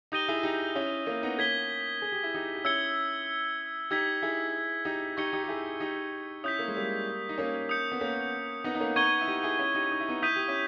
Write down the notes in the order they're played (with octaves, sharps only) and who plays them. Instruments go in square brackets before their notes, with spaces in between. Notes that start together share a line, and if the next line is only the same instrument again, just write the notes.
[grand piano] D#4 G4 [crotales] D#6 G6 A#6 D#7 G7
[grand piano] E4 G#4
D#4 G4
C#4 E4
A#3 C#4
B3 D#4
[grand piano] A#3 C#4 [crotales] G#6 B6 G7
[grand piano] G#4
G4
E4
D#4 G4
G4
[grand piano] C#4 E4 [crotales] E6 G#6 C#7 G7
[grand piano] D#4 G4 [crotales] E6 G#6 B6
[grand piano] E4 G#4
D#4 G4
[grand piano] D#4 G4 [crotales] C#6 G#6 C#7 G7
[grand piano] D#4 G4
G4
E4 G#4
D#4 G4
[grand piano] C#4 E4 [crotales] D#6 G6 B6
[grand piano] A#3
G#3
G3 A#3
D#4
A#3 C#4
[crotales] D#6 G6 C#7
[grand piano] B3
A#3 C#4
B3 D#4
D#4
A#3 C#4
[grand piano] B3 D#4 [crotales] C#6 G#6 D#7 G7
[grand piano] E4
D#4 G4
E4 G#4
C#4 E4
D#4 G4
D#4
E4
B3 D#4
[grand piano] E4 [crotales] D#6 G6 B6 D#7
[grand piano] G4
C#4 E4